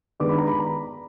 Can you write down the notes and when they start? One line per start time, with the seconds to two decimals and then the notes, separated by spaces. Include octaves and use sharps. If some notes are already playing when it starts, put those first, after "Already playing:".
0.20 D#3 G#3 B3 D4 D6
0.29 B5
0.38 A#5
0.47 B5
0.59 A#5